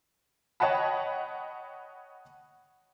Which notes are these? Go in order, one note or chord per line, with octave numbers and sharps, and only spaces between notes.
C#5 D#5 F#5 G5 A5 B5